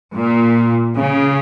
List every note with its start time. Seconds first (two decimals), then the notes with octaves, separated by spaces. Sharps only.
0.15 A#2
0.96 C#3